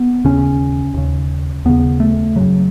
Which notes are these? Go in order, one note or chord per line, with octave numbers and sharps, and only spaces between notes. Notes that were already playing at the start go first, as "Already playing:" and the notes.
Already playing: B3
D#2 C#3 C#4
D#2 C#3
D#2 C#3 B3
A3
F#2 C#3 F#3